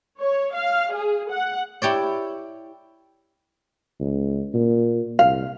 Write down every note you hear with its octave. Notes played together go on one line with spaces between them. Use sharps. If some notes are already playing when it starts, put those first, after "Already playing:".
C#5
F5
G#4
F#5
E4 G4 C#5 D5
C#2
A#2
C2 F5